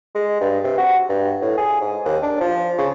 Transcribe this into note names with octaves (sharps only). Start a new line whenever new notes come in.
G#3
G2
C3
F#4
G2
A2
G#4
G#2
D#2
D4
F3
C#3